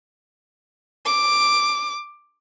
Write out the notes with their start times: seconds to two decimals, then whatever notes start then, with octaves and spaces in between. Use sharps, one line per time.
1.06 D6